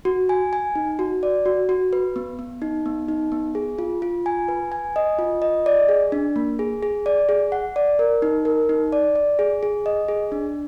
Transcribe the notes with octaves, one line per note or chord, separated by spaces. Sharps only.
F#4
G#5
G#5
D#4
F#4
D5
F#4
F#4
B4
B3
B3
D#4
B3
D#4
B3
G#4
F4
F4
G#5
B4
G#5
D#5
F4
D#5
D5
G#4
D4
A#3
G#4
G#4
D5
G#4
F#5
D5
A#4
D#4
A#4
D#4
D5
D5
G#4
G#4
D#5
G#4
D4